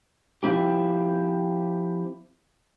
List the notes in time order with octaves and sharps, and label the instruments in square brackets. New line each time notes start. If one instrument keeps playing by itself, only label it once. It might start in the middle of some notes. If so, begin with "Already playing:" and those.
[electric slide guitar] F3 C4 E4 G4